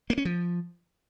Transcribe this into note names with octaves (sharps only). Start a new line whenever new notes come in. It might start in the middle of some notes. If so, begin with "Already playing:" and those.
A#3
C#4
F3